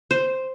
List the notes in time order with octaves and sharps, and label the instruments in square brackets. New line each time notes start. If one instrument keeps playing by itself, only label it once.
[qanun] C5